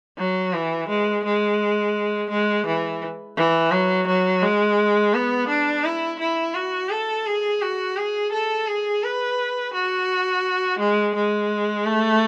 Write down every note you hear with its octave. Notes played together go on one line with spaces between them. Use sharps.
F#3
E3
G#3
G#3
G#3
E3
E3
F#3
F#3
G#3
B3
D4
E4
E4
F#4
A4
G#4
F#4
G#4
A4
G#4
B4
F#4
G#3
G#3
A3